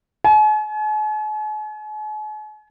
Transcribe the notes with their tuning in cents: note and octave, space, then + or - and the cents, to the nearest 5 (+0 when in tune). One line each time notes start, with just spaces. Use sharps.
G#5 +45